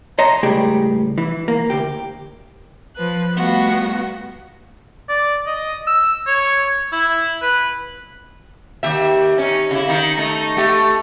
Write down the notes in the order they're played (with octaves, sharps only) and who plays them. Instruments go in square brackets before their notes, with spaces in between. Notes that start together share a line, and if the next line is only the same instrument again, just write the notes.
[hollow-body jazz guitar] C#5 D#5 A5 A#5 C6
C#2 A2 G3 G4 G#4 G5
E3
A#3
D2 G4
[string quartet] F3 B4 F#6
G3 A3 B3 F4 F#4
[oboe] D5
D#5
E6
C#5
E4
B4
[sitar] D#2 G4 E5
C#4 D#4
C#3 E4
D#3 D#4
A3 D#4
A3 G4